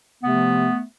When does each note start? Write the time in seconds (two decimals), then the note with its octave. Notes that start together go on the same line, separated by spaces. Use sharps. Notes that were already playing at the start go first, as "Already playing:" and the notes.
0.23 C3 F3 A3 B3